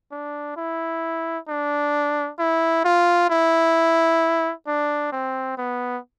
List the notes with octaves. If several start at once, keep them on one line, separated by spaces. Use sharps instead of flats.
D4
E4
D4
E4
F4
E4
D4
C4
B3